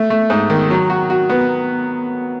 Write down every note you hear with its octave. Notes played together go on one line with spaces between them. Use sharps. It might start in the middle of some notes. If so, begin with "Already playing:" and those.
Already playing: A3
A3
G#2
D#3
F#3
F#4
F#4
B3